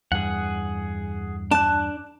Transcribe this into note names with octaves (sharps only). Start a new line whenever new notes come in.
E2 G2 G#4 F#5
D4 A5 F#6